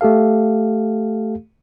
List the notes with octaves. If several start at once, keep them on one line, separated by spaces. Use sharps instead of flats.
A3 G4 A4 F5